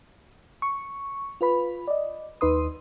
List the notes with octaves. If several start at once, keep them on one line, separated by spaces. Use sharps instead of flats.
C#6
F4 B4 B5
D5 D#5
D#2 D#4 B4 C6 D#6